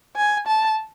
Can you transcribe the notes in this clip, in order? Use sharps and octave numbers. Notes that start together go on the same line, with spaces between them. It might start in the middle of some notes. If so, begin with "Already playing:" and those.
G#5
A5